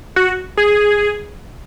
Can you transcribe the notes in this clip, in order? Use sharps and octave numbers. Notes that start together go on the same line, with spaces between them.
F#4
G#4